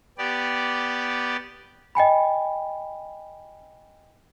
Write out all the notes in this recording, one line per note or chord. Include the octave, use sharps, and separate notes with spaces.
B3 G4 D5
D#5 G5 G#5 B5